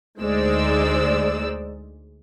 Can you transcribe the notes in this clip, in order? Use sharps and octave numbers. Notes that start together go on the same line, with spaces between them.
D2 G#3 D#4 C5 D5 E6